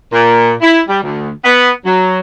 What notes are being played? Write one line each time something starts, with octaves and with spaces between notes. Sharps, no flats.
A#2
E4
G3
D2
B3
F#3